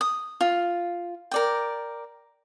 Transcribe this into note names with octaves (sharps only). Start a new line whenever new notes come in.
D#6
F4
A#4 D5 G5